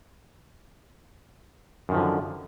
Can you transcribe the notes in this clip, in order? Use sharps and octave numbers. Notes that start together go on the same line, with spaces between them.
F#2 D3 D#3 F3